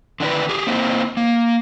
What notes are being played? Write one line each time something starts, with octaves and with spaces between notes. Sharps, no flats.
D3 D#3 D4 E4 B4
G4 G#4
A#3 C4 D#4 E4 C5
A#3